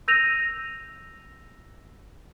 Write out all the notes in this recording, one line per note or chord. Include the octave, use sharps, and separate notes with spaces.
E6 G6 A#6 D#7 F7